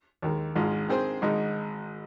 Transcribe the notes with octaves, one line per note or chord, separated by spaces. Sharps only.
D#2 D#3 G#3
G#1 G#2 G#3 F4 G#4
D#3 C4 G#4 C5
G#1 G#2 G#3 D#4